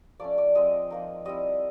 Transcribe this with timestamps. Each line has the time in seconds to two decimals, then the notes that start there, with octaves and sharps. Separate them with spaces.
0.20 F3 A3 C#4 D5
0.38 D5
0.55 F3 G#3 C4 D#5
0.90 F3 A#3 D#4
1.25 G3 C4 E4 D#5